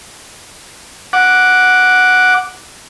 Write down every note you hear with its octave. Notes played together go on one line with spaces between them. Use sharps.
F#5 D6